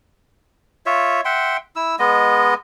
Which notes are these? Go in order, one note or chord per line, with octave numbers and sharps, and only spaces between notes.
F4 C#5 E5
E5 F#5 G5 C6
E4 E6
G#3 B3 D#5